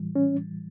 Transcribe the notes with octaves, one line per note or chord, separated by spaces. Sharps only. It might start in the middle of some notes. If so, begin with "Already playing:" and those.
Already playing: A2 E3 G3
C#4